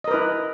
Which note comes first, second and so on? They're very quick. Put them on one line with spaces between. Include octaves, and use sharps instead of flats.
D#5 A#4 B4 E4